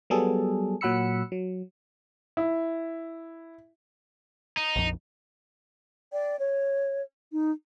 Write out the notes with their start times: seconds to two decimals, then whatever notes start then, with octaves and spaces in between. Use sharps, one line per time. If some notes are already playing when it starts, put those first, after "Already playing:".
0.10 F#3 G3 B3 G#4 A4
0.81 A#2 F#3 F#5 B5 E6 C#7
1.32 F#3
2.37 E4
4.57 D#4
4.76 A#1 F2
6.12 D5 G5
6.39 C#5
7.32 D#4